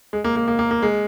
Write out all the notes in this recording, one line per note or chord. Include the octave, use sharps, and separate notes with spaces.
G#3
A#3
A#3
A#3
A#3
A#3
G#3